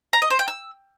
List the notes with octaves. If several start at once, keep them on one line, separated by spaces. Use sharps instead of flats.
A#5
D#5
C5
G5
E6